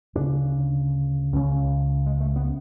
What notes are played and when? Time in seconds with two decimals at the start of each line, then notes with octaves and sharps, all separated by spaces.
0.16 D2 C#3 D4
1.33 C#2 C#3 C#4
2.06 G#3
2.21 A3
2.36 B3